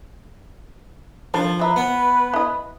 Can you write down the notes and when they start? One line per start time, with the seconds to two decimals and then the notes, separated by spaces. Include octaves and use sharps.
1.34 D#3 F3 D4 A4
1.59 E3 B4 E5 A#5
1.76 B3
2.34 E4 D#5